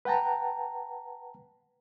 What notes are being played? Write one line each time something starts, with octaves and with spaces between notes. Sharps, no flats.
B4 F#5 G5 A5 A#5